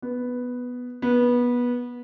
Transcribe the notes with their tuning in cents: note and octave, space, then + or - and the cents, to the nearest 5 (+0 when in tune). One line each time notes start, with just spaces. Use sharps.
B3 +0
B3 -20